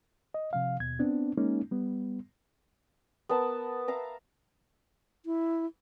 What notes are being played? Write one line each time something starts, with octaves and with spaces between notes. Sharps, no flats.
D#5
C3 F3 F5
D#2 B2 G#6
B3 C4 D4
G#3 A#3 C#4 D#4
G3 B3
B3 A#4 A5
E5 F5 A#5 D6
E4